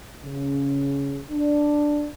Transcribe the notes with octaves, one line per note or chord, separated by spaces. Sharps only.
C#3
D4